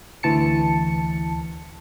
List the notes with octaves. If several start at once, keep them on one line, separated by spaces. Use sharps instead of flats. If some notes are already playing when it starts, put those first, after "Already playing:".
D2 E3 A5 C#7